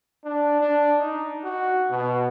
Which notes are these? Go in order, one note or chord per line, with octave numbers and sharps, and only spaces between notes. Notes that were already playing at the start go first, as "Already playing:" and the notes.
D4
D4
D#4
F#4
B2